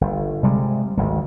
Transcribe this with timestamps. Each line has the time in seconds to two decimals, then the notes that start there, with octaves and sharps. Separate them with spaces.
0.01 G1
0.43 C3 G3 G#3
0.97 G#1 D2